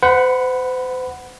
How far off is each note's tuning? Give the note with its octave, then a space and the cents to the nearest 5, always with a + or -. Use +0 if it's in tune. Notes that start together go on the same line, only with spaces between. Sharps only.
C5 -40 F#5 +0 B5 +0